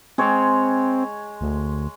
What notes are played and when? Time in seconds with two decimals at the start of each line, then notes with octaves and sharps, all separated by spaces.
0.18 G#3 C4 C#5
1.41 D2